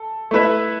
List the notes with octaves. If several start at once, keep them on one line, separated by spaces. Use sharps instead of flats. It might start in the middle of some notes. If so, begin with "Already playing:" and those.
Already playing: A4
A3 E4 B4 E5